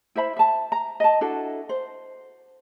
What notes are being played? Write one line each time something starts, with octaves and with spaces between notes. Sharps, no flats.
E4 C5 E5 B5
E5 A5
A#5
D#5 A5
D4 E4 F#4 A4
C5